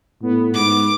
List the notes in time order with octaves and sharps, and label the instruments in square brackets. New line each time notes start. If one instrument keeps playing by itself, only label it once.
[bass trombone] A2 [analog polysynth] B3
[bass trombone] G#2 [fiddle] D6